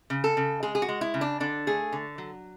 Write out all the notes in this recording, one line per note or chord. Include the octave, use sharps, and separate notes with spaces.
C#3
A4
C#3
G#3 G#4
G#4
F#4
G#3
E4
C#3
D4
D3 D4
A3 G#4
D3
F#3